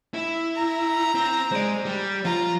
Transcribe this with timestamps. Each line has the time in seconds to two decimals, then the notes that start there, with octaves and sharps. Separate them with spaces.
0.14 E4
0.56 A#5
1.15 C4
1.52 G#3 C5 D5
1.85 G3
2.25 F3 F4 A#5